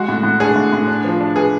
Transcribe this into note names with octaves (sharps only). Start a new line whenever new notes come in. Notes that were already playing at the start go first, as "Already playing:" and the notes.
Already playing: G#3 F#4
A2
A2
D4 G#4
A2
A2
D4
F3
D4
B3 G#4